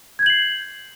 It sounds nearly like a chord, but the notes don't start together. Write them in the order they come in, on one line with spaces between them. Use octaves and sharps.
G#6 G6 F#7 C7